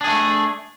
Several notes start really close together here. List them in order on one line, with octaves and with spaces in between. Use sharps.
D4 G#4 A3